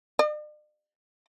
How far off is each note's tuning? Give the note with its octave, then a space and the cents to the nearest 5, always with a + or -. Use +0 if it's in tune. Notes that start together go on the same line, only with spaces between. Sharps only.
D5 +45